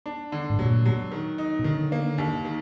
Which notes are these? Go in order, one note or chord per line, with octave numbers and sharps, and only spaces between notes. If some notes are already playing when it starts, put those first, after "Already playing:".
D4
D3
G#2
A#2 F#3
F#3
D#3
D#4
B2
D3 D#3
A#3
D#2
D#3